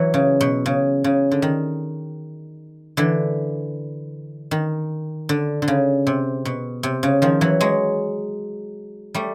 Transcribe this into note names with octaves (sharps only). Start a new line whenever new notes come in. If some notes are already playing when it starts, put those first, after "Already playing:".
Already playing: E3 F#3
C#3
B2
C#3
C#3
D3
D#3
D3 E3
D#3
D3
D3
C#3
C3
B2
C3
C#3
D#3 F3
E3 F#3
F#3 G#3
G3 A3